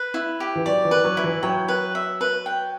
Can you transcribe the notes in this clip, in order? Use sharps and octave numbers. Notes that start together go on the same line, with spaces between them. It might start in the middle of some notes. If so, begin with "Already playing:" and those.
Already playing: B4
E4
G4
E3
F#3 D5
E3
B4
F#3
E4
E3
F#3 G5
B4
E5
B4
G5